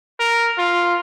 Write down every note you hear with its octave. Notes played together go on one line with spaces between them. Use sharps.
A#4
F4